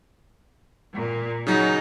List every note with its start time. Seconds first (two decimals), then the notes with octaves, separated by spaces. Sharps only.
0.94 A#2
1.47 C#3 F#3 D#4